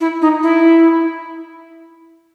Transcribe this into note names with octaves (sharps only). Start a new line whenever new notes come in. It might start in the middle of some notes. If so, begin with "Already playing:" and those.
E4
D#4
E4